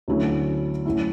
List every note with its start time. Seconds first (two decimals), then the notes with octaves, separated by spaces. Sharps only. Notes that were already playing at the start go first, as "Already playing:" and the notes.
0.08 D2 D3 F#3 C#4 E4
0.86 A2 F#3 C#4 E4